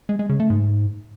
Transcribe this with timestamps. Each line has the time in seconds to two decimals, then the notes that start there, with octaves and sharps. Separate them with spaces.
0.09 G#3
0.19 G#3
0.29 C#3
0.40 A3
0.50 G#2